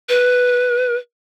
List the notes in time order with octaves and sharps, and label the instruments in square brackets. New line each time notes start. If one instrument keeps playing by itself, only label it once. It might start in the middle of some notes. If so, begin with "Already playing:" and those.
[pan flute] B4